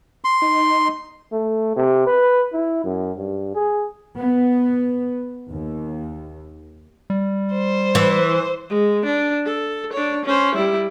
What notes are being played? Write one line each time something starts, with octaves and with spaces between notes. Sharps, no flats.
C6
D#4
A3
C3
B4
E4
F#2
G2
G#4
B3
D#2
G3
C5
E3
G#3
D4
A4
D4 C#5
C#4 C5
G3 E4